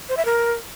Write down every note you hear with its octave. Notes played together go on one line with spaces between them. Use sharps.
C5
E5
A#4